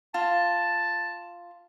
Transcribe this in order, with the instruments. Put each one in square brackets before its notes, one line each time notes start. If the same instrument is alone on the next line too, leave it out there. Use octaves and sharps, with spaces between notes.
[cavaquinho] F4 [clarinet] A5